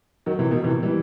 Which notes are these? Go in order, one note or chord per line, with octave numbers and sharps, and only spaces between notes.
D#3 F#3
C3 E3
B2 D#3
C3 E3
E3 G3